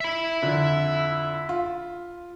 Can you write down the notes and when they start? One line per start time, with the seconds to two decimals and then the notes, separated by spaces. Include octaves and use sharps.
0.01 E5 B5
0.42 F2 D3
1.49 F4